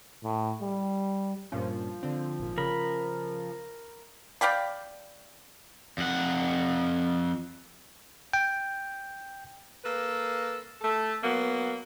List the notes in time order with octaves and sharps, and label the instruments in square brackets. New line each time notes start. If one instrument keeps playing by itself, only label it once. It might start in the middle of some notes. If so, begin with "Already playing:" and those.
[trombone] A2
G3
[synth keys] G2 A#2 C#4 [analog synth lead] F3
[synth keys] D3 C4
G#1 A#2
[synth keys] C#3 [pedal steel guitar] A#4 B5
[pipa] D5 F5 G5 B5
[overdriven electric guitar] F2 F#5
[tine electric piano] G5
[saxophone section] A#3 A4 B4
A3 A4
F#3 A#3 B3